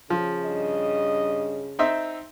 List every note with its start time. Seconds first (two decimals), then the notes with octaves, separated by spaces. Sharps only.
0.10 C#3 F3
0.46 G2 D#5
1.79 C4 D#4 E5